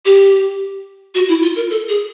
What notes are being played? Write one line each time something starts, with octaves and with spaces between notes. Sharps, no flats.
G4
F#4
E4
F4
A#4
A4
G#4